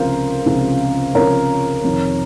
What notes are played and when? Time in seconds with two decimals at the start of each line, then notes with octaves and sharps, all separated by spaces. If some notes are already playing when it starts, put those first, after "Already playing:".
Already playing: C#2 C3 F3 A#4 C5 F5
0.46 C#2 C3 F3
1.15 C#2 C3 F3 A#4 C#5
1.84 F2 C3 D#3